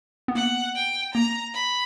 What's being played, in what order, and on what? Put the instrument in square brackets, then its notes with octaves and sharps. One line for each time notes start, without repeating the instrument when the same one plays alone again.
[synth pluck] B3
[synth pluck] A#3 [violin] F#5
[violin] G5
[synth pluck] A#3 [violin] A#5
[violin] B5